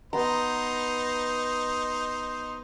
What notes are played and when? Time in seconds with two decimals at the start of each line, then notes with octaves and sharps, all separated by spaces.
0.13 B3 D#4 C5 A#5